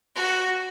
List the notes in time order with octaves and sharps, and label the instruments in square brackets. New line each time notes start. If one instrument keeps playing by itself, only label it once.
[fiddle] F#4